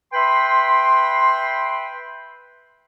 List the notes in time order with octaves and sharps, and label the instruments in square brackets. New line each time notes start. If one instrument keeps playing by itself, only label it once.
[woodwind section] B4 E5 G5 B5 C6